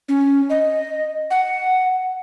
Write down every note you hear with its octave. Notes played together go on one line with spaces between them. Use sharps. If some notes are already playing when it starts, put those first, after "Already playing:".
C#4
D#5
F#5